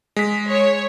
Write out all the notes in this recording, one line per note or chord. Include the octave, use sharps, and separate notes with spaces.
G#3 B6
C#5